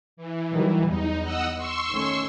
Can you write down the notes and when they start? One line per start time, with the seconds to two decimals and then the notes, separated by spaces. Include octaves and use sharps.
0.17 E3
0.53 D#3 F#3 G3
0.87 E2 D#4
1.21 D#5 F#5 E6
1.57 C6 C#6 E6
1.91 D#3 A3 C#4